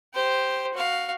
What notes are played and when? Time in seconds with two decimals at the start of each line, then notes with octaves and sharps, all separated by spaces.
0.14 G4 C5
0.74 F#4 F5